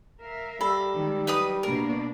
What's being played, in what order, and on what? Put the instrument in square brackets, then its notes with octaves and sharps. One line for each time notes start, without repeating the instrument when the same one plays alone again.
[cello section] A#4 E5 F5
[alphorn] G3 [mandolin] A4 [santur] B5
[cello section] D#3 G#3
[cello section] F#3 [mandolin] D#4 B4 D#6
[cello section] B2 A#3 D4 [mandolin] A#4